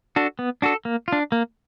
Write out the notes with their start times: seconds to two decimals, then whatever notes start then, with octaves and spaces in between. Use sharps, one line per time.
0.16 D4 F#4 A4
0.39 B3
0.62 D4 F#4 A4
0.85 A#3
1.08 D4 F4
1.32 A#3